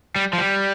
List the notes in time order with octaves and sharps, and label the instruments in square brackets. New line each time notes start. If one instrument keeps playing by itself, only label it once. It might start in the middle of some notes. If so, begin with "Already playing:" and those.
[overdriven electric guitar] G3
F3
G3